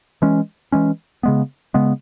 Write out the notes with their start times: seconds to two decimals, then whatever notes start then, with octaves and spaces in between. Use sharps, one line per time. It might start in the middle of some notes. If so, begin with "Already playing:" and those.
0.22 E3 G#3 C#4
0.72 E3 G#3 C#4
1.23 C#3 G#3 B3
1.74 C#3 G#3 B3